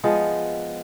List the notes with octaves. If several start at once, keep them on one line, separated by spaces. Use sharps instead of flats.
F3 G#3 B3